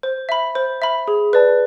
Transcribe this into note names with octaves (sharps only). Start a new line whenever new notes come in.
C5
E5 B5
C5
E5 B5
G#4
B4 D5 A5